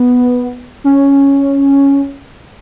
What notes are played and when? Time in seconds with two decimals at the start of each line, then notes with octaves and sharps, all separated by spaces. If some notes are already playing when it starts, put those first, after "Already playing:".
Already playing: B3
0.84 C#4